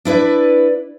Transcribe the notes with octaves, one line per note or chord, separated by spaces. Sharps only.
D4 E4 B4 D5